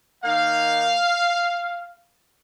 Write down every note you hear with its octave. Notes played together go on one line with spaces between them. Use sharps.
D#3 A#3 D#4 F5